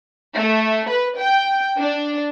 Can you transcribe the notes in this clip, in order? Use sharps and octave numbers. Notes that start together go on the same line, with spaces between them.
A3
B4
G5
D4